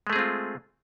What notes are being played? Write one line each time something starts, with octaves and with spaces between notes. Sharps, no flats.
G#3 A3 C4 F4 G#4